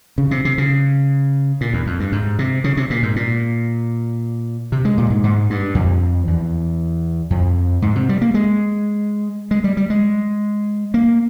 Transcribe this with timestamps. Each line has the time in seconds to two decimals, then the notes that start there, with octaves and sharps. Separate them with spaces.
0.18 C#3
0.31 C3
0.45 C3
0.58 C#3
1.61 A#2
1.73 E2
1.87 F2
2.00 G2
2.12 G#2
2.39 C3
2.64 C#3
2.77 C3
2.90 A#2
3.03 G#2
3.16 A#2
4.72 C3
4.85 G#3
4.98 A#2
5.10 G#2
5.24 G#2
5.50 G2
5.75 F2
6.27 E2
7.30 F2
7.82 G#2
7.95 C3
8.09 G3
8.22 A#3
8.34 G#3
9.51 G#3
9.64 G3
9.77 G3
9.90 G#3
10.94 A#3